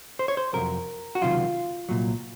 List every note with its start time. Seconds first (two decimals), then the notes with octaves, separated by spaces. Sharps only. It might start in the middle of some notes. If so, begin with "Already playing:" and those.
0.19 C5
0.28 C#5
0.37 C5
0.53 F2 C3 F#3 A#4
1.15 F#4
1.22 C#2 C3 D#3 F#3 F4
1.89 C2 A#2 F#3